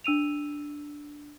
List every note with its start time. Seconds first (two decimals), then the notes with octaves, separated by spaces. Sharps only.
0.04 D4 E6 D#7 F7